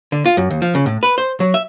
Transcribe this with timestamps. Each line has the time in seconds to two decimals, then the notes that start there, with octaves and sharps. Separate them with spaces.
0.12 D3
0.26 F4
0.37 F#2
0.50 D#2
0.62 F3
0.75 C#3
0.86 A2
1.03 B4
1.18 C5
1.40 F#3
1.54 E5